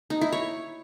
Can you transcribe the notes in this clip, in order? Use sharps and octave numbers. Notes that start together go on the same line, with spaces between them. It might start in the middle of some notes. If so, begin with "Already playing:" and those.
D#4
E4
C#5